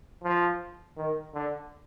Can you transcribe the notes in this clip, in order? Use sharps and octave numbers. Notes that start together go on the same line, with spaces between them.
F3
D#3
D3